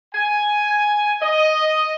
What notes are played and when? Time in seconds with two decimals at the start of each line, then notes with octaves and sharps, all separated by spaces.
0.15 G#5
1.22 D#5